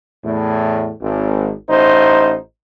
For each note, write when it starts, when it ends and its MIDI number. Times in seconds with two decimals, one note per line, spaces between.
0.25 0.92 40
0.25 0.92 45
1.02 1.52 32
1.70 2.35 33
1.70 2.35 63
1.70 2.35 72